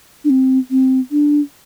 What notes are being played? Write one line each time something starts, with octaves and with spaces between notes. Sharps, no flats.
D4
C4
C4
D4